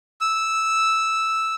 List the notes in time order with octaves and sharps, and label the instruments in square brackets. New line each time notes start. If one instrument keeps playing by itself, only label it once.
[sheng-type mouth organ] E6